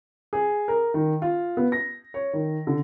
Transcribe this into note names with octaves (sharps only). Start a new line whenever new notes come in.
G#4
A#4
D#3
F4
B3
A#6
C#5
D#3
D3